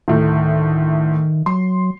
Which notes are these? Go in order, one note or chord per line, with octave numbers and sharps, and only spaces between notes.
D2 A2 D#3
F#3 C6